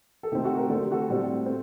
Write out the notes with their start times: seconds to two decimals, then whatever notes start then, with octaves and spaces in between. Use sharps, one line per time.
0.23 A4
0.32 C3 D#3 A3 C4 G4
0.44 F#4 A4
0.57 G4 A#4
0.69 D3 A3 C4 A4
0.81 G4
0.92 F#4 A4
1.08 A2 G3 C4
1.46 A3 C4